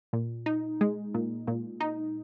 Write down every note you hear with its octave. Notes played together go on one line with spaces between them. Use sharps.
A#2
D#4
G#3
A#2
A#2
D#4